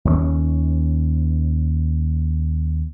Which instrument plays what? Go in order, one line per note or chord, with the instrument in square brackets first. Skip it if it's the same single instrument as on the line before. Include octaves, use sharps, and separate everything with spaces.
[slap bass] D#2 G#3 C#4